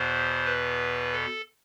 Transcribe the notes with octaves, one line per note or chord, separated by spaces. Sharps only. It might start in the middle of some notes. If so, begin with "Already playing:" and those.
Already playing: E2 B2 C5
B4
A4